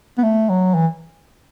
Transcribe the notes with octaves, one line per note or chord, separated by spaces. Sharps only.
B3
A3
F#3
E3